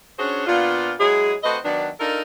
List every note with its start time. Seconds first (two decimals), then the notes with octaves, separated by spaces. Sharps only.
0.19 C#4 D4 F#4 G#4 C5 C#5
0.47 A#2 B3 D4 F4
1.00 F#3 G#3 E4 G#4
1.43 A3 C4 F#4 B4 D#5
1.64 D#3 F#3 B3 D4
2.00 D4 D#4 F4 A4 A#4